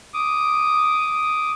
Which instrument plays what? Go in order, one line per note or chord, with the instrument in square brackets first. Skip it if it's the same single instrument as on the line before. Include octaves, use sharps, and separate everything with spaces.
[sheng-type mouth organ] D6 D#6